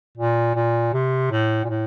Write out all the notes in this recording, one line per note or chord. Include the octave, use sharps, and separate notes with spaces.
A#2
A#2
C3
A2
A#2
A2